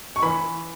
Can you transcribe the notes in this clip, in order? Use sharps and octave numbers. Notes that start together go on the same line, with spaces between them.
C#6
E3 B5